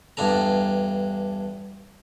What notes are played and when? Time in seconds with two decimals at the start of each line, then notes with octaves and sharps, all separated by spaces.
0.17 E2 G2 D4 A4 A#5